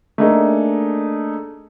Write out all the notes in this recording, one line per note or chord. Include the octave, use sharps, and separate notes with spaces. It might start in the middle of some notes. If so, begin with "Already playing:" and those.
A3 A#3 D4 D#4 G#4